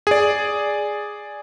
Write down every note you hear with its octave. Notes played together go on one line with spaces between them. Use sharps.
G#4 D5